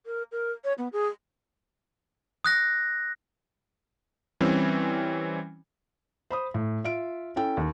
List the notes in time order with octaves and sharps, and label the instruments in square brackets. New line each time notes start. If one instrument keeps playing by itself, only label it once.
[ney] A#4
A#4
C#5
B3
G#4
[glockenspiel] D#6 F#6 A#6
[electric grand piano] E3 G3 C4 C#4
[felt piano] C5 B5 D#6
A2
F4 E5 D7
C#4 E4 A4 G5
D#2